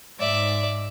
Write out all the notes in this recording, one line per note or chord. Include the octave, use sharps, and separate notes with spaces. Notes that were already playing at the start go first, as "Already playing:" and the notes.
G#2 D5 E5